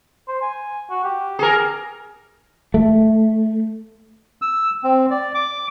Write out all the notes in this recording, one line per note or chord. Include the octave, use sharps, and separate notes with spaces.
C5
G#5
F#4
G4
G#4 A#4
A3
E6
C4
D5
D6